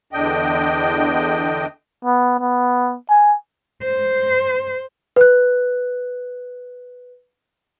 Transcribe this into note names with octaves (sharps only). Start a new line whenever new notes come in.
E2 D3 D4 D#5 G5
B3
B3
G#5
C5
B4 F#6